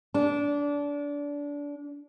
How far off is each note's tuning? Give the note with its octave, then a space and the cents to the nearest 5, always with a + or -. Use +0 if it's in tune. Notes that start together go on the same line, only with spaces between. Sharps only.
D4 -25